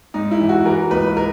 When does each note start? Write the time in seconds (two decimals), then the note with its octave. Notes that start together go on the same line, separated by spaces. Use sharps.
0.14 G#2 D#4
0.31 E4
0.41 E3
0.49 F#4
0.66 E3 A#4
0.91 C#2 B4
1.17 A#4